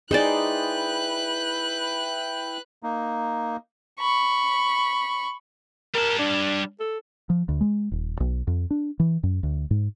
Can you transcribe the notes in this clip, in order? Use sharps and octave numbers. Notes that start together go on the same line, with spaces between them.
D#4 E4 G#4 B4 C5 D5 G5 F#6
A#3 D#4
B5 C#6
G3 A#4 A5
D4
A4
F3
D2
G#3
D#1
B1
F2
D4
E3
F#2
D2
G#2